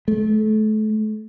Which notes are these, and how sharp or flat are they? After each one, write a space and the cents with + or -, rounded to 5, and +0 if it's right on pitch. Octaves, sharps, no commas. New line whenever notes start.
A3 -30